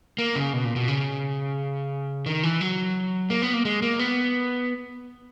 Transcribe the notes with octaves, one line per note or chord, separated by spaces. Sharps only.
A#3
C#3
B2
A#2
B2
C#3
D#3
E3
F#3
A#3
B3
A#3
G#3
A#3
B3